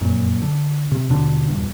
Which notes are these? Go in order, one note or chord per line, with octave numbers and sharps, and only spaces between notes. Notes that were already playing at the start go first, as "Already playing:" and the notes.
F1 F#2 A#2
D3
C3
D#2 B2 D3 D4
D#1 E2 G2